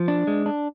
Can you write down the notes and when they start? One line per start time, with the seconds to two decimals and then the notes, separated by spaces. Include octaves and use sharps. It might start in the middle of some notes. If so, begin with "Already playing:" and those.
Already playing: F3
0.08 D4
0.27 G#3
0.46 D4